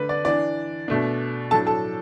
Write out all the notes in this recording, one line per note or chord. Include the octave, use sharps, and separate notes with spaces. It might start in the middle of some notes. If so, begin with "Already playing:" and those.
Already playing: D3 A3 D4 B4
D5
E3 D4 D5
B2 A3 D4
A2 F#3 D4 A4 A5
A4 A5